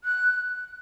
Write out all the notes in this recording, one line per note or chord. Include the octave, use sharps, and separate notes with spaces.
F#6